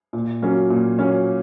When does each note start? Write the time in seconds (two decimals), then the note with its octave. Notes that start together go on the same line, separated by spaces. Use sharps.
0.13 A#2
0.42 F#3 A#3 C#4
0.70 A#2
0.99 F#3 A#3 C#4